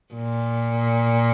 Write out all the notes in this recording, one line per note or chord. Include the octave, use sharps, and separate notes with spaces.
A#2